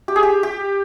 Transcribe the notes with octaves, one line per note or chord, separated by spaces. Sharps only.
G4
G#4
G4
G4